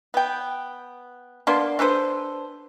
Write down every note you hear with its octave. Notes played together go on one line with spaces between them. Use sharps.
B3 G5
A#3 B3 D4 C6
D4 A4 B4 C5